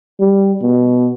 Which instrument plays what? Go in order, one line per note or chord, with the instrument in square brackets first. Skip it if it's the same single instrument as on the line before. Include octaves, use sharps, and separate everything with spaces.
[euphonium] G3
B2